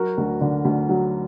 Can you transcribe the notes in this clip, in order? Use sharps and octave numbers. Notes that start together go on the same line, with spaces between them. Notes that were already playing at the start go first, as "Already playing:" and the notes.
Already playing: F#3 F#4 A#4
D2
D3
D2
F#3